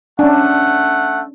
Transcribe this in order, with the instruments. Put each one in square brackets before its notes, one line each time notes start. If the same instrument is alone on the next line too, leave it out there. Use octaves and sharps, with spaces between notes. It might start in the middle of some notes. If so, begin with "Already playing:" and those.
[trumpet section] A3 F#5 [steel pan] C#4 D4